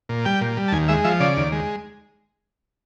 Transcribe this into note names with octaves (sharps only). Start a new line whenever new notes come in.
A#2
G3 G5
A#2
G3
A5
D#2 G#5
G#3 E5
F3 E5
C#3 D5
D#2
G#3